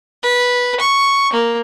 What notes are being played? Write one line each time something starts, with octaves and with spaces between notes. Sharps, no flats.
B4
C#6
A#3